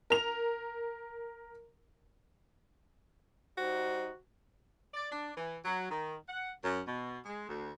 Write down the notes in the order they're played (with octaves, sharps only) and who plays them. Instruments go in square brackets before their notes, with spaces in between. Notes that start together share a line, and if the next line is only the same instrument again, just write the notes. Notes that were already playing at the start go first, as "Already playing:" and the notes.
[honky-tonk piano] A#4 F7
[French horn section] G3 D#4 C5 [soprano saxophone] F#4
[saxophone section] D5
D4
E3
F#3
D#3
F#5
F#2
B2
G#3
D2